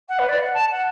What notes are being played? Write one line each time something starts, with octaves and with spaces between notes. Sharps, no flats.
F#5
B4
D5
F#5
A5
F#5